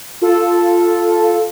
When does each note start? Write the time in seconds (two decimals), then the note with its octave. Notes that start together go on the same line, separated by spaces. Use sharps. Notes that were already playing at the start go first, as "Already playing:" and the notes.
0.21 F4 A4